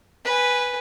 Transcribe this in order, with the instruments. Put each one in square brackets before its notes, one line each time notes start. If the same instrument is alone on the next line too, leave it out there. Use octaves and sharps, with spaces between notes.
[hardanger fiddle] B4 G#5